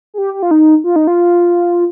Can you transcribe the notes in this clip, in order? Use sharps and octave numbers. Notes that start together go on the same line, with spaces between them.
G#4
G4
G4
F4
D#4
F4
D#4
F4